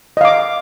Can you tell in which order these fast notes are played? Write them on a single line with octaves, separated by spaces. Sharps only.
D#5 F5 D6